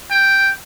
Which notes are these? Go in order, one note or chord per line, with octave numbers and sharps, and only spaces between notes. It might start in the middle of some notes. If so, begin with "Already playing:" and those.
G5